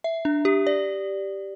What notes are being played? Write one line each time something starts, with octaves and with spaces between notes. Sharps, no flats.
E5
D4
G4
D5